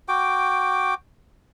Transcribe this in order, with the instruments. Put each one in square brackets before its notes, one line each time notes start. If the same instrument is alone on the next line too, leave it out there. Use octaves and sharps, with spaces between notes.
[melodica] F#4 G5 D6